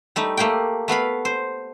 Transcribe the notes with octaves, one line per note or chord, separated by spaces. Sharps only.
G3 A3 D#4
A3 A#3 G4 D5 G5
A3 B3 F5 B5
C5